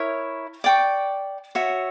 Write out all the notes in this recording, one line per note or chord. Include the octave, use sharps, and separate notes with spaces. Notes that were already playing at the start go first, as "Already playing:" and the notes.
Already playing: E4 A#4 C#5
D5 G5 C#6
F#4 C#5 E5